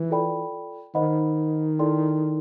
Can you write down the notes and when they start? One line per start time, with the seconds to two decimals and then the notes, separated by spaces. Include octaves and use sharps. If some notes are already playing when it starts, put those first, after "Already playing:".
Already playing: E3
0.10 F4 A4 D5 G5 B5
0.95 D#3 C5 D#5 F#5 B5
1.79 E4 A4 D5 G5 C6